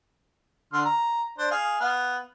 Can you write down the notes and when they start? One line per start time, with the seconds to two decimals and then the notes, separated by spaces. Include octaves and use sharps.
0.73 D3 C6 F6
0.85 A#5
1.38 D4 C5
1.51 G#4 F5
1.80 B3 F5